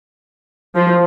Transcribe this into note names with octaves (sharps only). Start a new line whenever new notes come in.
F3